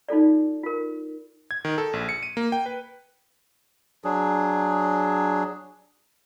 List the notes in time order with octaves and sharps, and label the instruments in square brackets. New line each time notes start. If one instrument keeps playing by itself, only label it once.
[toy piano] D#4 F4 A4 D5
F4 A#4
[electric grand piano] G#6
D#3
A4
A#1
C#7
D#7
A#3
G5
B4
[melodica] F#3 D4 G#4